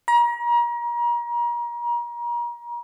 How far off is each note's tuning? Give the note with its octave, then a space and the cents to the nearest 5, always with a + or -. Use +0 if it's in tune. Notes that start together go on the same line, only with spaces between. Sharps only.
A#5 +35